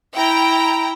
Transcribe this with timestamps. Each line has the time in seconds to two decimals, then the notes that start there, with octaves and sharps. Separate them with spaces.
0.15 E4 G5 A#5